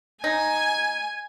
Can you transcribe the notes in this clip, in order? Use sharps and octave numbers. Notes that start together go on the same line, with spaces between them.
D#4 G#5